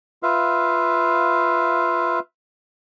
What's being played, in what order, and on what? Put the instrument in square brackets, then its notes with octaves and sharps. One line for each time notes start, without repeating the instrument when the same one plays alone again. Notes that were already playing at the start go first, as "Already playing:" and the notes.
[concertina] F4 B4 E5 F5